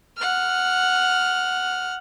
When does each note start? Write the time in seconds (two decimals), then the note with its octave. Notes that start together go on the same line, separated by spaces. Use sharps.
0.17 F#5 F6